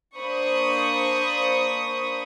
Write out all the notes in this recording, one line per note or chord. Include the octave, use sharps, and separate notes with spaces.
A#3 D4 C5 B5 C#6 D#6